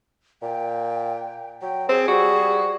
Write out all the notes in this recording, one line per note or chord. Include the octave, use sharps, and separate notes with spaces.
A#2 G5
F#3 G5
C4 G#4
G3 F#4